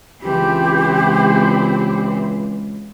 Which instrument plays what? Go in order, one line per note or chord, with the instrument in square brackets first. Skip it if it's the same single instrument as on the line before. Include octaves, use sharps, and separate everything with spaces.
[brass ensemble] C#2 [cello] E3 C4 [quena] G4